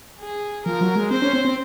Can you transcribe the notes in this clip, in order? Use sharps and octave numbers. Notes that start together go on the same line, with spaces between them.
G#4
F3 A#4
F#3
G#3
C4 C5
C#4
C4
C4